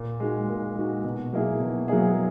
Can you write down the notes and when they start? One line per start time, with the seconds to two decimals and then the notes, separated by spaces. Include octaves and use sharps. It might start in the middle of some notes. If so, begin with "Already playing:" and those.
Already playing: A#2
0.20 G#3 D#4 F#4
0.49 A#2
0.76 G#3 D#4 F#4
1.04 B2
1.33 F#3 A#3 E4 G#4
1.60 B2
1.88 F#3 A#3 E4 G#4